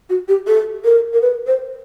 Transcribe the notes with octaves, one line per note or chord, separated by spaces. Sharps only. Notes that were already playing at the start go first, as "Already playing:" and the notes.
F#4
G4
A4
A#4
A#4
B4
C5